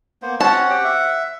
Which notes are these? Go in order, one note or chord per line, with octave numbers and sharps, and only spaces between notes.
A#3 B3 C5
C4 C#4 F#4 C#5 F#5 A5
G4 G5
E5